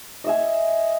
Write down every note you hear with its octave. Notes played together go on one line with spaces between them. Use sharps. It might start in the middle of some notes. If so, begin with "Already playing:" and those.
D#5 E5 G#5